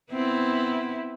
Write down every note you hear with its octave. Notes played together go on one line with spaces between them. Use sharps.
B3 C4 E4